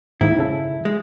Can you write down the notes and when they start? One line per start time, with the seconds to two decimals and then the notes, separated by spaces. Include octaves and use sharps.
0.21 G#2 D#3 A#3 E4
0.39 C#3 A4
0.85 G#3